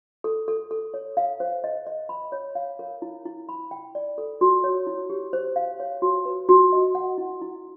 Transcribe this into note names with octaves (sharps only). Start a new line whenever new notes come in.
A4
A4
A4
C#5
F5
C5
D#5
D#5
B5
C#5
F5
A#4
E4
E4
B5
G5
D5
A4
F#4
C#5
E4
G4
C5
F5
C#5
F#4
B4
F#4
D#5
F#5
E4
E4